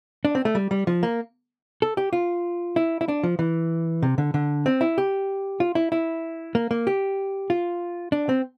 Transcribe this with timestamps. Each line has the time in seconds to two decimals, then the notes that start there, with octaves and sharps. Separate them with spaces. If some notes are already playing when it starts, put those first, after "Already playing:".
0.25 D4
0.35 C4
0.45 A3
0.55 G3
0.71 G3
0.87 F3
1.03 A#3
1.82 A4
1.97 G4
2.13 F4
2.76 E4
3.01 E4
3.08 D4
3.23 F3
3.39 E3
4.02 C3
4.18 D3
4.34 D3
4.66 C4
4.81 E4
4.98 G4
5.60 F4
5.75 E4
5.92 E4
6.55 A#3
6.71 A#3
6.87 G4
7.50 F4
8.12 D4
8.29 C4